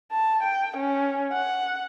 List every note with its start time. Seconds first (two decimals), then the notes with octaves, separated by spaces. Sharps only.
0.12 A5
0.43 G5
0.77 C#4
1.32 F#5